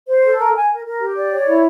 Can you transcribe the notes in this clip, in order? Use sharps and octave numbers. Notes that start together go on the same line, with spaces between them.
C5
A4
A#4
G#5
A#4
A#4
G4
D5
C#5
E4